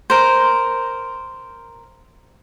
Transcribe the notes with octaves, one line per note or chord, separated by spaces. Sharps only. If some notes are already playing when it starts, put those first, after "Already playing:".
A#4 C5